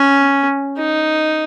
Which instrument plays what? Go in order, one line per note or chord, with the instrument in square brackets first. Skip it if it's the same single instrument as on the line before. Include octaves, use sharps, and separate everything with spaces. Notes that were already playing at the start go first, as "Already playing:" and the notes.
Already playing: [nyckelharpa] C#4
D#4